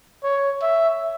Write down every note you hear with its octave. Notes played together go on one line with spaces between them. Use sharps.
C#5
E5